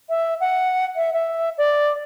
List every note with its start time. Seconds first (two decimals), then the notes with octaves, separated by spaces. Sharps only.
0.09 E5
0.40 F#5
0.96 E5
1.13 E5
1.58 D5